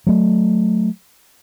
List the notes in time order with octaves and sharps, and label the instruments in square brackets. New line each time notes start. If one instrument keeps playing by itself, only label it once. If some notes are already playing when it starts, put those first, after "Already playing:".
[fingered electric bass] F#3 A3